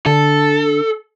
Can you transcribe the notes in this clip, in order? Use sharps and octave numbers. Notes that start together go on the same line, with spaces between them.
D3 A4